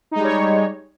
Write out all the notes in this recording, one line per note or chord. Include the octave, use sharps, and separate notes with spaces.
G3 G#3 D#4 C#5